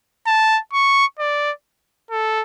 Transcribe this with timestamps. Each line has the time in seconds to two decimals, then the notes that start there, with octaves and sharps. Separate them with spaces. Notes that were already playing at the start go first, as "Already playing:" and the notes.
0.27 A5
0.73 C#6
1.19 D5
2.11 A4